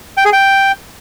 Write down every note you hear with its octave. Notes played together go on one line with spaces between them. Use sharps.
G5
G#4
G5